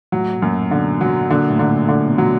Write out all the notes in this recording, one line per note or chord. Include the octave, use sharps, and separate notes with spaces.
A2 F#3
A2
F#2 A#2
B2 D3
B2 F#3
A#2 D3
A2
D3
A#2
A2 D3
B2
F#3